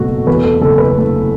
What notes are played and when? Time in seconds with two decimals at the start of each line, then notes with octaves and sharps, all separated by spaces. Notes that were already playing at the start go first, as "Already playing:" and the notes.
Already playing: F#1 B2 A3 F#4
0.27 E2 B4
0.44 A4
0.61 F#1 A4
0.78 B4
0.95 A3